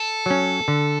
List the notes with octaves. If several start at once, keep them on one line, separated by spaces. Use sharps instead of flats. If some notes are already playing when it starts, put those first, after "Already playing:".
Already playing: A4
F#3 C#4
D3